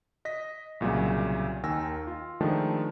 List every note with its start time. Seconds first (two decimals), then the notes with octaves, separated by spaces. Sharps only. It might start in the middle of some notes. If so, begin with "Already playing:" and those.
0.25 D#5 A#6 B6
0.81 C2 A#2 C#3 F#3
1.63 D#2 D#3 G#5 E6 A#6
2.07 F4
2.41 D#3 F3 G#3 A3 D4 A4